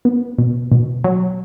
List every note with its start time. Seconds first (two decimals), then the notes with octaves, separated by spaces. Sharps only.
0.05 B3
0.38 B2
0.72 B2
1.04 F#3